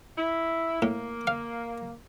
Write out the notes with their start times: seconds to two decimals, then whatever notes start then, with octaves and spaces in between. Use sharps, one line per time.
0.17 E4
0.82 A2 A#3
1.27 F5